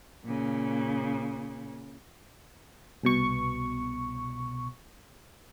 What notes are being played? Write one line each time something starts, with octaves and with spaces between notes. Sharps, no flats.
A#2 C#3
C2 B2 C#6